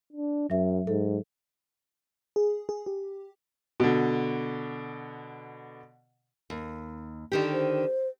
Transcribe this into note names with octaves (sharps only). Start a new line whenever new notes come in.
D4
F#2 F#3 E5
G#2 A4
G#4
G#4
G4
B2 D3
D#2
D3 D#3 G4
C5